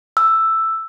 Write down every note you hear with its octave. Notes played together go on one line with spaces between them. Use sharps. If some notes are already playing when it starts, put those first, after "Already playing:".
E6